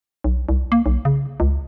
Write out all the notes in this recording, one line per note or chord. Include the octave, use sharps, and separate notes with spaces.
B1
C2
A#3
B1
C#3
C#2